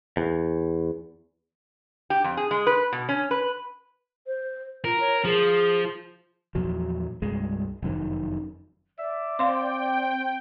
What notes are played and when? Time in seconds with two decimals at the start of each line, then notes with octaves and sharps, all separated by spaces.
0.17 E2
2.10 G4
2.24 F2
2.37 G#4
2.51 G#3
2.67 B4
2.92 B2
3.09 C#4
3.31 B4
4.27 C5
4.84 F4 A#4
5.00 C#5
5.25 F3 G#4
6.55 E2 A#2 F3 F#3
7.22 C2 G2 G#3
7.82 F1 F#2 D#3
8.99 D5 E5
9.39 C4 C5 F5 G5 C6